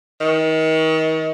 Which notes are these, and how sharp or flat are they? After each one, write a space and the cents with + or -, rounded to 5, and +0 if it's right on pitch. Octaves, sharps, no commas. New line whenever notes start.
D#3 +35